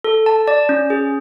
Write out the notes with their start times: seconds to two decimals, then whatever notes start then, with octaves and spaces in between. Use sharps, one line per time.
0.04 A4
0.26 A5
0.48 D5
0.69 C#4
0.90 G#4